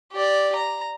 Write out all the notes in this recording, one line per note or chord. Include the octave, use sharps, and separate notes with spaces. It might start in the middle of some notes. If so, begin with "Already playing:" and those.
G4 D5
A#5